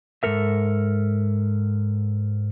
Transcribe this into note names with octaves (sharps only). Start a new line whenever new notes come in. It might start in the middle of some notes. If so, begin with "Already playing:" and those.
G#2 G#3 A4 A#4 E5